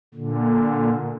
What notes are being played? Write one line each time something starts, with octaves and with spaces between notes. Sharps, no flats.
A#2 D3